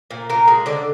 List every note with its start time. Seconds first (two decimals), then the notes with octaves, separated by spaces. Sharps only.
0.11 A#2
0.30 A#2 A#4
0.48 G#3
0.66 D3 D5